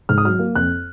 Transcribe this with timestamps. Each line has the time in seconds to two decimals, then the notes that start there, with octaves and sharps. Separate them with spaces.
0.09 G#2 F6
0.18 D#6
0.25 F#3 F6
0.39 A#3
0.55 F2 F#6